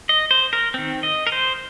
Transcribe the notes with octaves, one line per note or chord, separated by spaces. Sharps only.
D#5
C5
A#4
D#3 C4
D#5
A#4
C5